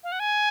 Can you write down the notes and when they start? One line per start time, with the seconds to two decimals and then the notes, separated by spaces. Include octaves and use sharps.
0.04 F5
0.12 F#5
0.20 G#5